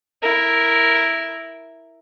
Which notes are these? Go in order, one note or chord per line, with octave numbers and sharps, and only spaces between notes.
E4 A#4